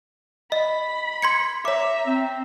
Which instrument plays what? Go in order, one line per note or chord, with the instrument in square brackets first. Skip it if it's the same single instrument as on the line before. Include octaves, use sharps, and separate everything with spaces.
[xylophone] D#5 [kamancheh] B5
[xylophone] C6 G#6 C#7
[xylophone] C#5 D6 [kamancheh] E5 A#5
[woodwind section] C4